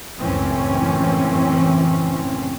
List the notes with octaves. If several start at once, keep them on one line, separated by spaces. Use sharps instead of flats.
C#2 F#2 A2 E3 C4 C#4